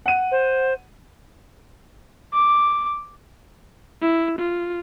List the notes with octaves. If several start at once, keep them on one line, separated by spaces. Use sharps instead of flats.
F#5 D#7
C5
D6
E4
F4